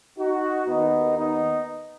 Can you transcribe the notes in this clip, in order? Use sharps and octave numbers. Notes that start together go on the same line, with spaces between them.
D#4 F#4
D#2 D#3 B3 D#4
B3 D#4